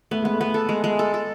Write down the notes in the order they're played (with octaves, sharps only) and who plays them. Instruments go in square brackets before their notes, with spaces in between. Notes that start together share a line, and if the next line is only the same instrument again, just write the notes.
[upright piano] A3 [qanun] B3
[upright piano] G#3 [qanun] B3
[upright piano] A3
[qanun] B3
A4
G#3
G#3
A4
A4